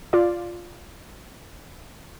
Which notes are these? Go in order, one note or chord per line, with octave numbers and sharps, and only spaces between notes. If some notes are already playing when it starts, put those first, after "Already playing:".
F4 D5